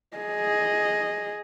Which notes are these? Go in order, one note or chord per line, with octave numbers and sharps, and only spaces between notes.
G#4 D#5